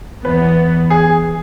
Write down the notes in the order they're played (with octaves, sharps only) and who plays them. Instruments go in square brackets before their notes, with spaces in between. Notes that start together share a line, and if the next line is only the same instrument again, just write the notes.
[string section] E2 E3 B3 [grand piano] B4
[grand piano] G#4